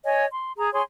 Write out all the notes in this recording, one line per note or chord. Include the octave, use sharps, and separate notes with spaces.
C#5 D#5 G#5
C6
G#4 A#5
G#4 C#5 G#5 C6